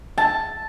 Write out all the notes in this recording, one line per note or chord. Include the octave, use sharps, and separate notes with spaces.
A5